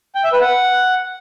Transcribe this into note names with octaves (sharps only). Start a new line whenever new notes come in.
G5
E5
B4
F#5